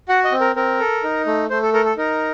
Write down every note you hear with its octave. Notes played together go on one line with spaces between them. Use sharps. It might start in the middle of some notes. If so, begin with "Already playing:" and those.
F#4 F#5
D#5
C4
A#4
C4 A#4
A4
D#4
A3
A3 C5
A4
A4 A#4
A4
D#4 A#4